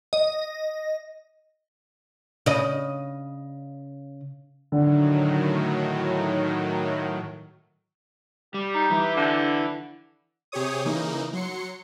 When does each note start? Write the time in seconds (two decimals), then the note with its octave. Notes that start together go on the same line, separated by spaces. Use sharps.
0.13 D#5
2.46 C#3 D#5
4.72 A2 D3 D#3 F#3
8.54 G3 G4
8.74 D#4
8.90 E3 E4
9.17 D3
10.52 C3 G4 G#4 C#5 D#6
10.85 C#3 E3 A#3 D#4
11.33 F#3 C6 C#7